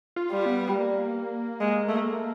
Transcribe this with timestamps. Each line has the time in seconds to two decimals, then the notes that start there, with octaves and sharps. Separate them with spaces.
0.16 F4
0.32 G3
0.46 B3
0.74 A#3
1.61 G#3
1.88 A3